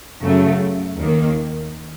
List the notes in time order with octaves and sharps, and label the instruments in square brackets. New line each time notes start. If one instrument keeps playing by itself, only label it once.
[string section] F#2 C#3 F#3 A3
D#2 D#3 A#3